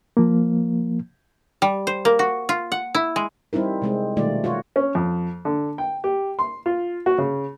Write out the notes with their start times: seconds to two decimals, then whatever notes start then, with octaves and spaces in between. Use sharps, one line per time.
0.17 F3 A#3
1.62 G3
1.87 C5
2.05 A#3
2.19 F#4
2.49 F4
2.72 F#5
2.95 E4
3.16 G#3
3.53 G3 C4 D#4 E4 A#4
3.82 C3 G#3 C4
4.16 B2 D#3 G3 A3 F4 D5
4.44 F4 F#4 C#5
4.76 C#4
4.95 F2
5.45 D3
5.78 G5
6.04 G4
6.39 C6
6.66 F4
7.06 F#4
7.18 C#3